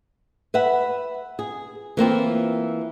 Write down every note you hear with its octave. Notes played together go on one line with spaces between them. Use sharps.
B4 E5 F#5
G#4
E3 A#3 C4 F4